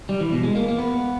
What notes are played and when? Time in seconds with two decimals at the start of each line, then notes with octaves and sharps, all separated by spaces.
0.09 G3
0.21 E3
0.32 B2
0.43 G#3
0.56 A#3
0.68 A#3
0.79 B3